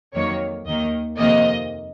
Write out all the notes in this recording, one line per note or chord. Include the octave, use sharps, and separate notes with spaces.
F2 D#3 F#3 A#3 C#5
D#2 D#3 A#3 D#5
F2 C3 D#3 A#3 D#5